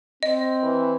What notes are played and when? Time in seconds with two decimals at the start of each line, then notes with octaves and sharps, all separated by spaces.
0.23 C4 D#5
0.63 E3